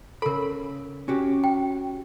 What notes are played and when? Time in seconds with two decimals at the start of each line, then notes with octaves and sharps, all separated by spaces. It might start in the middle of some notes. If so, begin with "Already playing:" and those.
0.22 C#3 A4 A#4 B5
1.08 C#4 F#4 G4
1.44 G5